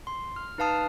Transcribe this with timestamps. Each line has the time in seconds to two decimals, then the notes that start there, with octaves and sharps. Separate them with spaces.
0.07 C6
0.36 F6
0.58 D#4 B4 F5 A5 D#6 F6